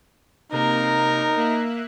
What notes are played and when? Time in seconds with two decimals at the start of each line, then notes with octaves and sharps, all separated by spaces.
0.52 C3 A#3 D#4 A#4
1.37 A#3 E5 F#6